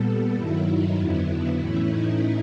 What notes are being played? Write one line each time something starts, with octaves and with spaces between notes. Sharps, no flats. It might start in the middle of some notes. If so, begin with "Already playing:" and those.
Already playing: A#2 G3 B3 A4
G2 D#3 F#3 E4
D#4
F2 D3 F#3 B3 E4
E4
A2 E3 A3 C#4
D#4